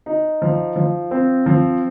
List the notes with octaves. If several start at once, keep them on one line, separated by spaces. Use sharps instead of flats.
D#4
F3
F3
C4
F3